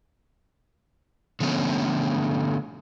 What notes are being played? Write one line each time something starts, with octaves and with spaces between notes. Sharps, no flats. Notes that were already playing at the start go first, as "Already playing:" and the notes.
D3 F3 A3 B3 C#4